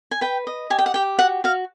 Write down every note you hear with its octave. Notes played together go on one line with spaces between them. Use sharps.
G#5
B4 G5
D#5
G4 G#5
G5
F#5
G4 G5
F#4 F#5
F#4 F5